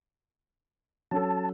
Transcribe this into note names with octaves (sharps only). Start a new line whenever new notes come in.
F#3 C#4 A4 A5